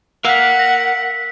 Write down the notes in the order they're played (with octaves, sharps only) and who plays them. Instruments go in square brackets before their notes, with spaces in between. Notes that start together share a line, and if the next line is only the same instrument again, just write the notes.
[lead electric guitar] A#4 F5 [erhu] F#5 [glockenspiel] E6 F#6 B6
[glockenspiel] A#6